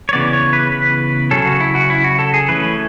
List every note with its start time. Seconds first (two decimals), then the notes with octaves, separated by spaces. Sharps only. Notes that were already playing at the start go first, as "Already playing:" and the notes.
0.09 C#5
0.13 C#3 E3 B3 D5
0.33 C#5
0.53 B4
0.72 B4
1.31 C#3 F#3 C#4 A4
1.46 F#4
1.60 E4
1.75 F#4
1.90 E4
2.04 F#4
2.19 A4
2.34 G#4
2.48 E3 A3 C#4 B4